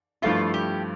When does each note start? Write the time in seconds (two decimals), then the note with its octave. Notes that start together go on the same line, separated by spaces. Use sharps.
0.22 G2 F3 A3 E4 F4
0.54 G4